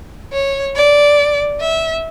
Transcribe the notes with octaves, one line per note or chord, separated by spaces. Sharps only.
C#5
D5
E5